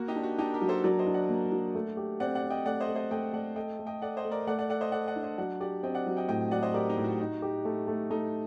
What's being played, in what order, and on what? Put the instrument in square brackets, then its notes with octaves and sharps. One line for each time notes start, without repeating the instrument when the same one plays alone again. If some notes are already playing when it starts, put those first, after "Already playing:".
Already playing: [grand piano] A#3 [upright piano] F#4
[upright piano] D#4 G4
[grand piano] D4
[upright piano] F#4
[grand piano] D4 [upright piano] D#4 G4
[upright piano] G4 A#4
[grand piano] F#3
[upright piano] A4 C5
[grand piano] F#3 [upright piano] A#4 D5
[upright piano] C5 D#5
[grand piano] D4
[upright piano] D5 F#5
[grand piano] A#3
F#3
A3
G4
[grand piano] C4 [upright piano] D5 F#5
[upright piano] D5 F#5
[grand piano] C4
[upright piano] D#5 G5
[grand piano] A3 [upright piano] D5 F#5
[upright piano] C5 D#5
[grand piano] A3
[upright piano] C5 D#5
[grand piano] A3 [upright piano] D#5 G5
[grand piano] A3 [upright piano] D5 F#5
[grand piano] A4 [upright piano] D#5 G5
[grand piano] A3
[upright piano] D#5 G5
[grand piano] A4 [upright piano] D5 F#5
[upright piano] C5 D#5
[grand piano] A3
[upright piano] A#4 D5
[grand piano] A3 [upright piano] D5 F#5
[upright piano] D5 F#5
[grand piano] A4 [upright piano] D5 F#5
[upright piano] C5 D#5
[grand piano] A4 [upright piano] D5 F#5
[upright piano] D5 F#5
[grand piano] D4
[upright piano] C5 D#5
[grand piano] F#3 [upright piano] D5 F#5
[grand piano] G4 [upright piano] D5 F#5
[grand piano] C4 [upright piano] D#5 G5
[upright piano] D5 F#5
[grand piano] F#3
[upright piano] D#5 G5
[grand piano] A2 [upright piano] D#5 G5
[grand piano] F#3 [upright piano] D5 F#5
[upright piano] C5 D#5
[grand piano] G4 [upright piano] A#4 D5
[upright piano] D#4
[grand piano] A2
[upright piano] F#4
[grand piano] D#4
G4
A3
A3
[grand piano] A3 [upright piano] D#4